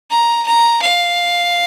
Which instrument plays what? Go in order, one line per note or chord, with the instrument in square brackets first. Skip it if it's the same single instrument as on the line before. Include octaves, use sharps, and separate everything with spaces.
[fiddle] A#5
A#5
F5